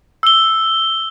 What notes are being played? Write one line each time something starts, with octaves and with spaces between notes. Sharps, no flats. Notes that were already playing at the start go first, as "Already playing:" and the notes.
E6 G7